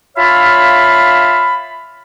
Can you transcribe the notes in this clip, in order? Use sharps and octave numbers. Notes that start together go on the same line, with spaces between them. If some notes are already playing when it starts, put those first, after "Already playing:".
F4 C#5 E5 F5 A5 B5